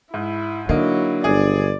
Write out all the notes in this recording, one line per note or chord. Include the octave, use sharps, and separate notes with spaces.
G#2 E4
D3 F#3 A#3 D#4 E4
G1 G#4 D5